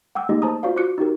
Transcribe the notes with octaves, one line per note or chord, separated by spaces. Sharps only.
F#5 G5 D6 E6
A3 A#3 D#4 G4 G#4 D#5
C5 A5 A#5 D#6
F4 F#4 C5 D5 F5
F4 F#4 C5 D6 F#6 C#7
D#4 F#4 G4 A#4